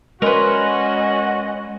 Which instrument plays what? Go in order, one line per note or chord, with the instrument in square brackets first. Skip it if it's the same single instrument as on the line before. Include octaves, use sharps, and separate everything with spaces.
[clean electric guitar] G#3 D5 C6 [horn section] C#4 F#4 [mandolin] A#4 B4 [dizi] D#5